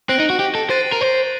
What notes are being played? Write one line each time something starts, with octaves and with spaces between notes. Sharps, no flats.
C4 F#6 A#6 D7 F#7
D#4
F#4
G4
A4
C5 F#6 A6 C7 D#7
A#4
C5